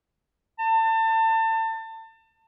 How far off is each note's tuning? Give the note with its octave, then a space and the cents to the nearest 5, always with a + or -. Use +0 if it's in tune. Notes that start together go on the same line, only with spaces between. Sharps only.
A5 +30